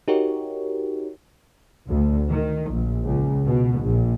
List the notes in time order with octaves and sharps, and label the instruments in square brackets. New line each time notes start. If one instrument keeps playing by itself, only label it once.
[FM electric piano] D#4 F#4 G4 A#4 C#5
[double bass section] D2
D#3
A#1
C#2
B2
A#1